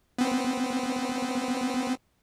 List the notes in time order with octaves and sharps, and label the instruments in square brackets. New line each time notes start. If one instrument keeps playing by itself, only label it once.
[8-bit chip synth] B3 C4